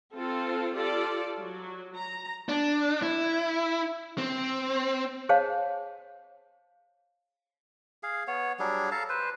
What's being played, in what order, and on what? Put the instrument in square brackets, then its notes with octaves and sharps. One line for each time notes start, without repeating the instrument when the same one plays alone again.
[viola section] C4 F4 A4
F4 G4 A4 D5
F#3
A#5
[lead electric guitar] D4
E4
C4
[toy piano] G#4 C5 C#5 D#5 F5 A5
[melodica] G#4 F5
B3 C#5
F#3 G3 D4 G#4
A4 F5 A5 A#5
B4 C5